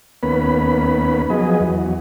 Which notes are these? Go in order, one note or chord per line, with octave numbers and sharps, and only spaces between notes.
D#2 A#3 B3 C#4 B4 B5
F3 F#3 B3 G#4 D#5
E2 F#3